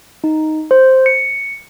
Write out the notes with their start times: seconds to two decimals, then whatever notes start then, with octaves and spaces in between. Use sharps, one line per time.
0.24 D#4
0.71 C5
1.06 C#7